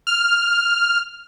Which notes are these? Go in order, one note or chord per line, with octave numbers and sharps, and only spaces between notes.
F6